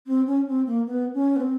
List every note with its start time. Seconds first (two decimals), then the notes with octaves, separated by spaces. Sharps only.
0.06 C4
0.27 C#4
0.47 C4
0.66 A#3
0.86 B3
1.14 C#4
1.36 B3
1.40 C4